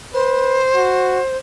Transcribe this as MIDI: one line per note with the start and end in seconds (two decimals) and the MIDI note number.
0.14 0.60 71
0.14 1.37 72
0.75 1.20 66